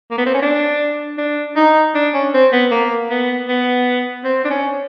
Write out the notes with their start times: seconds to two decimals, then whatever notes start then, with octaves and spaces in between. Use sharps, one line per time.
0.11 A#3
0.18 B3
0.26 C4
0.34 C#4
0.42 D4
1.18 D4
1.56 D#4
1.95 D4
2.14 C#4
2.34 C4
2.52 B3
2.71 A#3
3.10 B3
3.49 B3
4.24 C4
4.45 D4
4.50 C#4